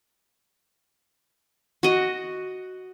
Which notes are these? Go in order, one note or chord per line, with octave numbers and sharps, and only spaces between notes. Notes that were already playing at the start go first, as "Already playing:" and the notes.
F#4 D#5